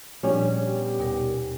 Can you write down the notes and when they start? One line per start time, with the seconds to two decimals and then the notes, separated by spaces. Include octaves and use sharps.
0.23 A#2 F3 G3 C#4 D4
0.63 B3 G4
0.99 D#2 B2 A#4